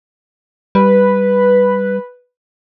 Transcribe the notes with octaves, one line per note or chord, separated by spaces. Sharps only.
G3 B4